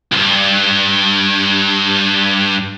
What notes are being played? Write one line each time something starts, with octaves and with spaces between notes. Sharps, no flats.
C#2 G2